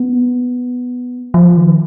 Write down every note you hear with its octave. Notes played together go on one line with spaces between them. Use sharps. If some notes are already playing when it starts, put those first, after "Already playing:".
Already playing: B3
F3
D#3